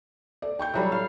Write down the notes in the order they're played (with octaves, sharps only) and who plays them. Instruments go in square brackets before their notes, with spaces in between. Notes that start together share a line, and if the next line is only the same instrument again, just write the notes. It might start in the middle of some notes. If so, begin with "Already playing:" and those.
[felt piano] A4 D5
G5 C#6 G6
[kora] E3 F#3 G3 [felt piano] A4 C#5
[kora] F5